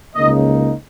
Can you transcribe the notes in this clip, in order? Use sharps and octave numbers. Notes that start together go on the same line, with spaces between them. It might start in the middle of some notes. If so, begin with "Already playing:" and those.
C#2 C#3 A#3 D#4 D#5